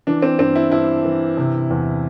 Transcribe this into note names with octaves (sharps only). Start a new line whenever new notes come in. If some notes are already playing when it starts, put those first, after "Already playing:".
E3 D4
C4
G2 C4
E4
G2 E4
E3
C3
E2